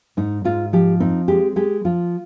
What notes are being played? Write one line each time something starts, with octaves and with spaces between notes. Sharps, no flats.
G#2 D#4
G#2 F4
F3 G4
C4 D#4
G#3 G4
G#3 G4
F3 F4